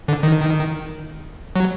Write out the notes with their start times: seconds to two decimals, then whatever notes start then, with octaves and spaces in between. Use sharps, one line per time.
0.08 D3
0.23 D#3
1.56 F#3